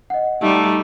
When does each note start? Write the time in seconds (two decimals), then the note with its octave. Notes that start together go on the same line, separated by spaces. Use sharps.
0.10 D#5 F#5
0.42 G3 A3 D#4